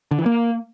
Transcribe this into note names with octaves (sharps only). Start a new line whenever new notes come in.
D3
E3
A#3